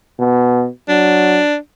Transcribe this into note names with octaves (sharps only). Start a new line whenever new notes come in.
B2
F#3 D4